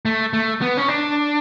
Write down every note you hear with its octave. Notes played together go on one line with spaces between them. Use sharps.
A3
A3
B3
C#4
D4